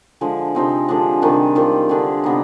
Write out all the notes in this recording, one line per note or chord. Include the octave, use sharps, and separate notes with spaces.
D3 F3 G#3
C3 F3 C4 D#4
D3 F3 G#3 D4
C3 D#3 G3 D4
D#3 G3 C4 F4
D3 G3 D4 G#4
C3 G3 B3 D#4